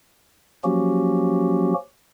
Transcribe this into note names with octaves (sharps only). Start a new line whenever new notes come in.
F3 F#3 A#3 C#4 F#4 G4